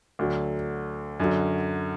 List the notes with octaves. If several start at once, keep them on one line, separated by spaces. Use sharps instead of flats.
D2 D3 F#3
F#2 D3 F#3